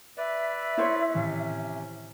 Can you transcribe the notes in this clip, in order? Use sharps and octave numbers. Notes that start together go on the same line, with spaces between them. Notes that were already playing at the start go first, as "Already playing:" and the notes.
B4 D5 E5
E4 C5 C#5
A2 C3 D#3 E3 C#4